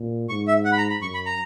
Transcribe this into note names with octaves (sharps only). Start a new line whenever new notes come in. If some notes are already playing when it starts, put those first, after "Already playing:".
Already playing: A#2
G#2 C#6
E5
F#5
B5
A#5
B5
F#2 C#6
B5
A#5